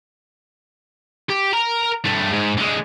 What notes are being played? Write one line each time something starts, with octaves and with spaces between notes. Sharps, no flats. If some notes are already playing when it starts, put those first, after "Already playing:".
G4
A#4 A#5
G2 A3
G#2
D3 G#3